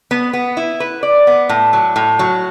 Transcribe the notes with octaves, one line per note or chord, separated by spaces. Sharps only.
B3
B3
E4
B4
D5
B3
A2
F#3
A2
F#3